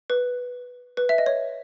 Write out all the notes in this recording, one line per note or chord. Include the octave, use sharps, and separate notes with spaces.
B4
B4
E5
D#5
C#5